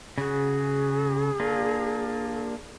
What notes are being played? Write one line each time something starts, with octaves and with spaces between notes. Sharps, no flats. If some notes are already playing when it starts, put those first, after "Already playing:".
C#3 F#4 G#4
A#3 D4 F4